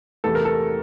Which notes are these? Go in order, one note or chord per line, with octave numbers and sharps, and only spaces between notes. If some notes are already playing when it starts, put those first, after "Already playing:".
E2 C3 E3 A3 A4
A#4
A4